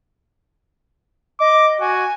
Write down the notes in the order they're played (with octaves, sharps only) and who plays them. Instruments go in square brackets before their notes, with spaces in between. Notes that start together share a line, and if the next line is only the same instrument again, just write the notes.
[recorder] D#5 [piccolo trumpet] D6
[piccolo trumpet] F#4 [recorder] G#5